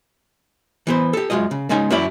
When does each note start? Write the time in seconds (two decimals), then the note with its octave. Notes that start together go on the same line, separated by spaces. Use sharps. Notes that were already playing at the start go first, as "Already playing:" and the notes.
0.87 E3 B3 C5
1.13 G4 A4
1.30 F#2 E3 G#3 F4 D#5
1.51 C#3
1.69 C#3 G#3 C#4 D#4 G#5
1.90 F#2 C#4 E4 F#4 D5 B5